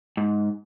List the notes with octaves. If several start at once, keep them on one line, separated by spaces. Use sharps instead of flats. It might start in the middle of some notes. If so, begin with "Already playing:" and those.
G#2